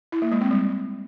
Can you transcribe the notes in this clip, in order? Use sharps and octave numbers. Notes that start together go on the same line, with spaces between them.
E4
A#3
G#3
C4
G3